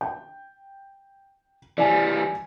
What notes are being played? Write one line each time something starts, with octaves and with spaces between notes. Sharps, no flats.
G5
E3 G3 D5 G#5